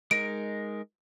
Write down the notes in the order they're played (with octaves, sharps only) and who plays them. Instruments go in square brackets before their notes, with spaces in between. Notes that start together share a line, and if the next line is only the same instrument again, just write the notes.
[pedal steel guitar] G#3 D#4 A#4 [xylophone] D7